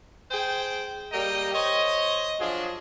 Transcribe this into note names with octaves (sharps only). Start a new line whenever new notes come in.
G#4 C5 G5
G3 A#3 D#5 G5 A#5
C5 C#5 D#5
F3 F#3 D4 G#4